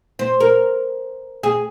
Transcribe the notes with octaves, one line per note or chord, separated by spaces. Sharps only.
C5
A#4
G#4